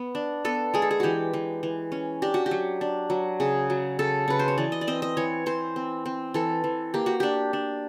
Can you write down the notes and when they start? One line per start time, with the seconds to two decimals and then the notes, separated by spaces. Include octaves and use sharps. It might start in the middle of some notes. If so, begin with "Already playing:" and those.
Already playing: B3
0.15 D4
0.45 B3 A4
0.74 G#3 G#4
0.82 A4
0.91 G#4
1.00 E3 F#4 G4
1.33 E3
1.63 E3
1.92 C#4
2.22 D4 G4
2.34 F#4
2.46 G4
2.51 F#3
2.81 D4
3.10 F#3
3.40 C#3 G#4
3.70 F#3
3.99 C#3 A4
4.28 C#3 B4
4.39 C5
4.48 C#5
4.58 E3 D5
4.72 D#5
4.81 D5
4.87 C4 D#5
5.02 D#5
5.17 E3 C#5
5.46 E3 C5
5.76 C4
6.06 C4
6.34 E3 A4
6.64 E3
6.94 A#3 G4
7.06 F#4
7.20 D4 G4
7.53 D4